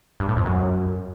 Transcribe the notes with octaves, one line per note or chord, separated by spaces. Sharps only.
G2
A2
F2
F#2